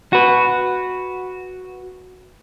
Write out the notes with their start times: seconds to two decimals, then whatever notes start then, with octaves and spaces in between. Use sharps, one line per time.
0.13 F#4 B4